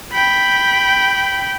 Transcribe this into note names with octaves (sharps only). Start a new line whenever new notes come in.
G5 B5